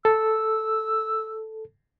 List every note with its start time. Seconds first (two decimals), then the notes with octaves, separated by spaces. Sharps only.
0.05 A4 E6